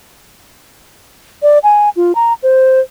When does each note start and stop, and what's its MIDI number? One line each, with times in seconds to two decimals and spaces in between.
1.43 1.59 74
1.63 1.89 80
1.96 2.15 65
2.15 2.33 82
2.43 2.80 72